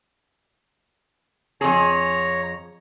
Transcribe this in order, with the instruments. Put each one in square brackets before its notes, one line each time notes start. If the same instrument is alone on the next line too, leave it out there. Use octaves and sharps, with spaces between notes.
[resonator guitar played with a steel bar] F2 G#4 [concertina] C#5 A#5